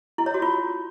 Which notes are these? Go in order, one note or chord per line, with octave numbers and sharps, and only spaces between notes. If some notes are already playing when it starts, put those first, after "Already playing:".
E4
C#5
F#4
F4